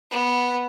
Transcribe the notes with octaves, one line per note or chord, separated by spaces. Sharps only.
B3